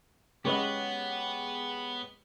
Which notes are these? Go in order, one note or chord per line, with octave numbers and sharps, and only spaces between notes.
G#3 B3 C#4 G4 B4 C#5 D#5 F#5